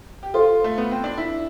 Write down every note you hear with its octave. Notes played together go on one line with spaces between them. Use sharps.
G4
F4 A4 C5 F5 C6
A3
B3
C4
D4
E4